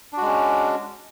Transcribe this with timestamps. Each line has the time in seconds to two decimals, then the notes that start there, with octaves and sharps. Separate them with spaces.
0.13 D4
0.17 F#4
0.22 G#3
0.26 C#4